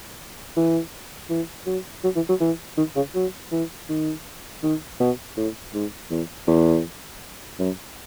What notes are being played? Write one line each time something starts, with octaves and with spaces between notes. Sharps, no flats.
E3
E3
F#3
F#3
E3
F#3
E3
D#3
C#3
F#3
E3
D#3
D#3
B2
A2
G#2
E2
E2
F#2